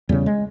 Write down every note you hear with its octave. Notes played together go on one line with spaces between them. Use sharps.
E2 C#3 G3
G#3